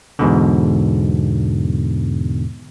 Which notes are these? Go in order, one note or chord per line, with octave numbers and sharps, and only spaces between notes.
E2 G#2 B2 D3